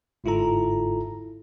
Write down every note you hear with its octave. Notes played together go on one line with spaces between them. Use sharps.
G1 G#2 E4 F4 A4 A#5